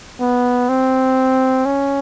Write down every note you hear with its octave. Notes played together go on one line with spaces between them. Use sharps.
B3
C4
C#4